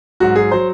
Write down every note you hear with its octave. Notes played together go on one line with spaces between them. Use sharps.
G#2 F#3 F#4
G#4
F#3 C5